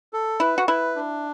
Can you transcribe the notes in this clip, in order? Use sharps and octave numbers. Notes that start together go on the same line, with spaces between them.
A4
E4 B4
F#4
E4 B4
D4